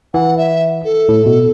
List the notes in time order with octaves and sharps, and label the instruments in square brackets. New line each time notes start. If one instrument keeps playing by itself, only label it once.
[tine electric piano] E3 [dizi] F#5
[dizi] E5
A4
[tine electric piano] A2
B2